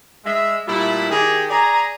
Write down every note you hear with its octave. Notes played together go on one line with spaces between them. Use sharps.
G#3 E5
A#2 G3 A3 E4
D#3 G4 G#4
G#4 D5 G#5 A#5